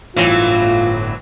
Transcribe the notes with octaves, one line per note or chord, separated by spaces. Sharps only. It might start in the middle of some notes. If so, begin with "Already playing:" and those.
G1 A2 E3 F#3 C4 F4